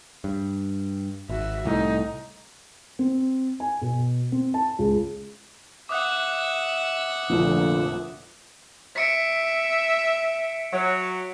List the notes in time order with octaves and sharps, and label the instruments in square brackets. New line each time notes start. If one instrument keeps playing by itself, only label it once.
[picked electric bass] G2
[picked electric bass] G#1 [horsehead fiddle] F#4 E5
[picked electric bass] C2 A2 [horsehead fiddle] D#4
[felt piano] C4
G#5
B2
C4
A5
C#2
[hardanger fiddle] E5 F#5 [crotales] D6 D#6 F#6
[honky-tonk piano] F1 A#1 [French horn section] A#2 D3
[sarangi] E5 [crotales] B6 C#7 D7
[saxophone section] F#3